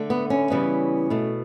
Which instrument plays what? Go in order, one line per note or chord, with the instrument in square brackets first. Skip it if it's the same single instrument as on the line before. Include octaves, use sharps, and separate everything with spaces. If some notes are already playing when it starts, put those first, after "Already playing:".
Already playing: [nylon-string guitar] D3 A3
B3
C#4
C#3 E3 G3 B3
B2 A3